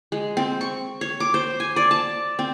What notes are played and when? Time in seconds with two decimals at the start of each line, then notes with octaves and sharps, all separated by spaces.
0.12 G#3
0.37 C4
0.61 C#6
1.01 C#5
1.20 D6
1.34 C5
1.60 G#5
1.76 D5
1.91 A5
2.39 C4